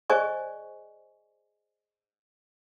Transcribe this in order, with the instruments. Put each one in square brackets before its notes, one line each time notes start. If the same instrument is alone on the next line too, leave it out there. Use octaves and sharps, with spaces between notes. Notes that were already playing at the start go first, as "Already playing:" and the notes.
[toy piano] G#4 C5 D5 D#5 G#5 C#6